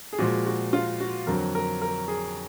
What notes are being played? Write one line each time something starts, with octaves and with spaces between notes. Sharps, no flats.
G#4
A#2 F3 G#3 F#4
F#4
F4
F#4
F2 D3 F#3 A#4
A#4
A#4
G#4